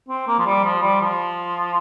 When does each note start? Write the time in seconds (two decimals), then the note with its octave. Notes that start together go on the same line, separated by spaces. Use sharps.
0.09 C4
0.28 A#3
0.39 F3
0.46 G3
0.64 F3
0.82 G3
1.01 F3